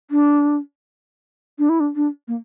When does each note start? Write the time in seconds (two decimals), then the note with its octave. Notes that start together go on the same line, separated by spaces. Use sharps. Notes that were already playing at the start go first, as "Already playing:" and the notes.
0.11 D4
1.59 D4
1.69 E4
1.80 D4
1.95 D4
2.28 A#3